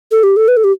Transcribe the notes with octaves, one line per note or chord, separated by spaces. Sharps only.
A4
G4
A4
B4
A4
G4